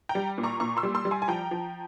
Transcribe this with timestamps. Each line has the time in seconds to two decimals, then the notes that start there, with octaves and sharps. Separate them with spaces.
0.09 G5 A#5
0.15 G3
0.38 A#2
0.43 A#5 C#6
0.60 A#2 A#5 C#6
0.77 C6 E6
0.83 G3
0.95 C6 E6
1.05 G3
1.11 G#5 C6
1.22 G#5
1.28 F3 G5 A#5
1.51 F3